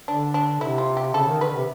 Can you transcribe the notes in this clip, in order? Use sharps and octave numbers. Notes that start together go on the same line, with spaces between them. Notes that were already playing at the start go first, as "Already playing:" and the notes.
D3 D4
D4
C3 E4
F4
G4
C#3 A4
D#3
D3 B4
C3